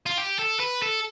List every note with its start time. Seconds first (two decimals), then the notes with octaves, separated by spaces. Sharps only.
0.06 F4
0.18 G4
0.39 A4
0.60 B4
0.82 A4